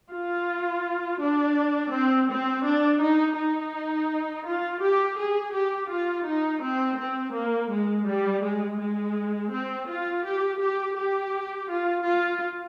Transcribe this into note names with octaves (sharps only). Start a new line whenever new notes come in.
F4
D4
C4
C4
D4
D#4
D#4
F4
G4
G#4
G4
F4
D#4
C4
C4
A#3
G#3
G3
G#3
G#3
C4
F4
G4
G4
G4
F4
F4